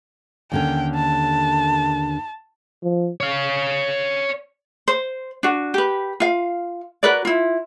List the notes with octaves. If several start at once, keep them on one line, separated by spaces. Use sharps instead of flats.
D#2 D3 C#4 G5
A5
F3
C#5 F5
C5
D4 F#4
G4 B4
F4 F5
F#4 A#4 B4 D5
E4 F4